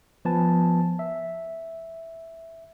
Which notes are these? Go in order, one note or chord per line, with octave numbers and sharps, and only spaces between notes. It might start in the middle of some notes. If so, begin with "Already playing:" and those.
F3 B3 B4 G#5 A5
E5